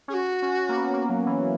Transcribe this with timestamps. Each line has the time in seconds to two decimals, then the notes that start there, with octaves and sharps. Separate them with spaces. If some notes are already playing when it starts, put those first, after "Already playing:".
0.08 C#4 G#4
0.13 F#4
0.42 C#4
0.69 A#3
0.76 B3
0.94 A#3
1.09 F#3
1.26 E3